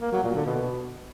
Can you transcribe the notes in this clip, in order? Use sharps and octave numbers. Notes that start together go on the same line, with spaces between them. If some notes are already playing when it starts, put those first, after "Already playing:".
A#3
F#3
A#2
D3
B2